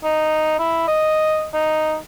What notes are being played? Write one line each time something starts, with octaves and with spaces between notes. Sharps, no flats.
D#4
E4
D#5
D#4